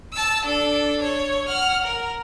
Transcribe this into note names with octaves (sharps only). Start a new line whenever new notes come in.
A5 E6
D4 A4
C#5
F#5 F6
A#4